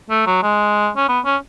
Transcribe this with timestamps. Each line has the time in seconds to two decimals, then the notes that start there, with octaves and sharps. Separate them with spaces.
0.10 A3
0.27 F#3
0.43 G#3
0.97 C#4
1.09 B3
1.25 C#4